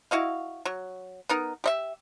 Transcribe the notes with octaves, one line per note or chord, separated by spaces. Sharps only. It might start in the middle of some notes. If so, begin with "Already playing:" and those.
E4 F#4 D#5 F5
F#3
B3 D#4 A#4
G4 D#5 E5